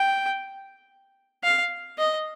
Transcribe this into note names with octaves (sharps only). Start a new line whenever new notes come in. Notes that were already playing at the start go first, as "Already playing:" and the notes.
Already playing: G5
F5
D#5